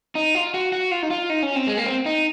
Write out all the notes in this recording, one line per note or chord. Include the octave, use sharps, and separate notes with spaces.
D#4
F4
F#4
F#4
F4
D#4
F4
D#4
C#4
C4
G#3
A#3
C4
D#4